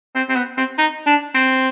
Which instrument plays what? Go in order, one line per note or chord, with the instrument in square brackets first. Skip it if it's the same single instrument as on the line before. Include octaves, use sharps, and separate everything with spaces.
[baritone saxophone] C4
C4
B3
C4
D#4
D4
C4